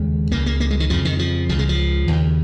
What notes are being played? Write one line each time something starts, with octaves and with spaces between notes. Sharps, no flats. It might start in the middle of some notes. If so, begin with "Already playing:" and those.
Already playing: D#2 C#3 G#3
C#2 C#3 A#3
A#3
A#3
G#3
D#3
F2 C#3 F3
D#3
F3
C#2 C#3 F3
G#3
F3
D#2 C#3